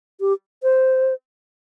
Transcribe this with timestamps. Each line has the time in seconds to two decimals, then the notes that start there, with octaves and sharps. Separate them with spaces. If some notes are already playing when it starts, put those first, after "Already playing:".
0.20 G4
0.63 C5